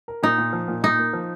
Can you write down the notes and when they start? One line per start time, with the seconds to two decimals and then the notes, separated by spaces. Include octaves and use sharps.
0.08 A#4
0.23 A#2 D#4
0.38 A#2
0.53 F3
0.68 A#2
0.83 A#2 D#4
0.99 A#3
1.13 F3